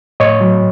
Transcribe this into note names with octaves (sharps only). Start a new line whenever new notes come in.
A2 C#5 D#5
F#3